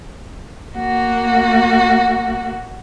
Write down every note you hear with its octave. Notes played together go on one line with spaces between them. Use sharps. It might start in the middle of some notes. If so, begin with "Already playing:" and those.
A#3 F#4